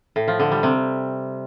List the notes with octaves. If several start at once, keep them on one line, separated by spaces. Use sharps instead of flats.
A2
F3
D3
G3
C3